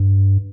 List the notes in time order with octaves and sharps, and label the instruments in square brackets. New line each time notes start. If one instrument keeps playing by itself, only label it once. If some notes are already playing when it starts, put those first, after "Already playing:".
Already playing: [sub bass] G2